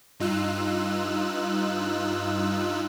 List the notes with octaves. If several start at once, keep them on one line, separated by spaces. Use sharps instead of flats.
G2 D#4 F4 E6 F#6